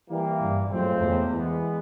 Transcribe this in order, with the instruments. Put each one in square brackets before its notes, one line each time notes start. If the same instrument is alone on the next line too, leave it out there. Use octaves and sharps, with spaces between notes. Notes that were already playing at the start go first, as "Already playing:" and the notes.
[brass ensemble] E3 G3 A#3
[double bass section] G2
[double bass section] F#2 [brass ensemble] A2 F3 G#3 C4
[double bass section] E2
[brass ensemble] E3 G#3 B3